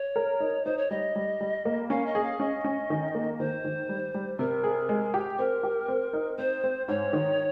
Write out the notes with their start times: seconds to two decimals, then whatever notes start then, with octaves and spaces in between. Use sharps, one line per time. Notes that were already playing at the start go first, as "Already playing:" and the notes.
Already playing: C#5
0.16 A#4
0.40 D#4
0.65 D#4 C5
0.78 C#5
0.90 G3 D#5
1.16 G3
1.41 G3
1.65 A#3
1.90 C#4 F5
2.06 D#5
2.15 G#4
2.23 F5
2.40 C#4 D#5
2.64 C#4
2.90 D#3
3.15 A#3
3.39 D#3 C5
3.64 D#3
3.89 G3
4.14 G3
4.39 C3 A#4
4.64 G#4
4.89 G#3
5.14 G4
5.39 C4 A#4
5.63 G4
5.88 C4
6.13 D#4
6.38 C4 C5
6.64 C4
6.88 G#2 C#5
7.13 D#3